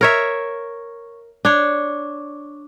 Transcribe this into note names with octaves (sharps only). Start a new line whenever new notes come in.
A#4 C#5 E5
D4 C#5